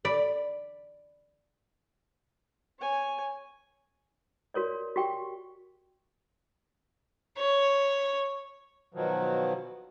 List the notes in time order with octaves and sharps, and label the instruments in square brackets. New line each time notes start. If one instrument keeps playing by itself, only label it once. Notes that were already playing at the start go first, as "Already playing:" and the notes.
[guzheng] D5 B5
[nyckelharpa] C#5 G#5
[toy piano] F#4 A#4 C#5 D5
F#4 G4 G5 C#6
[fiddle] C#5
[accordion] B2 D#3 F3 F#3